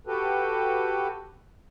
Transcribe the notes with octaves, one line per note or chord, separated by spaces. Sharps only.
F#4 G4 A4 B4